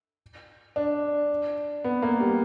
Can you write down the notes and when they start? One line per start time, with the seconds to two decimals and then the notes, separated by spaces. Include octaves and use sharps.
0.76 D4
1.84 B3
2.02 A#3
2.20 G3